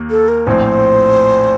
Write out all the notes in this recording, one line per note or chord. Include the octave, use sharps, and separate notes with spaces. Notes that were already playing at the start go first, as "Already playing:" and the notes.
Already playing: D#2 A#3
A4
A#4
A#1 A2 F3 C4 C5